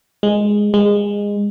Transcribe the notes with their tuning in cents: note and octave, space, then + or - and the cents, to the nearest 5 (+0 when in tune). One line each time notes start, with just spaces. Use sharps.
G#3 -5
G#3 -20